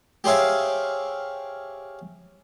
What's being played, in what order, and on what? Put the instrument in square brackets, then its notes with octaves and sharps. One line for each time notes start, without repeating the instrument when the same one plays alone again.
[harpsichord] G4 G#4 C5 C#5 E5 F5